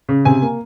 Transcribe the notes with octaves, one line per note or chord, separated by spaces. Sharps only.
C#3
C3 G#5
A#3